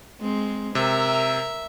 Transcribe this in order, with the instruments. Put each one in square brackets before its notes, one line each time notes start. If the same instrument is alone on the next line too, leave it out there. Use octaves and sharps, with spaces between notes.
[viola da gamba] G#3 C4
[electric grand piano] C3 [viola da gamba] A#4 [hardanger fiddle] E5